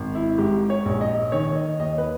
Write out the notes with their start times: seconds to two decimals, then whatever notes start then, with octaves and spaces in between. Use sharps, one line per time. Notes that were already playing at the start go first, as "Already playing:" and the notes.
Already playing: G#1
0.15 E4
0.38 G#2 G4
0.70 C#5
0.85 A#1
1.01 D#5
1.32 D#3 C#5
1.56 D#5
1.79 D#2 D#5
1.98 B4